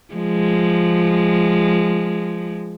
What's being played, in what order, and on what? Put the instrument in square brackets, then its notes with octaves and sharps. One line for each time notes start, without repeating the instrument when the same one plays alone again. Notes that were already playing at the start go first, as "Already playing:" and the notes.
[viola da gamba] F3 G#3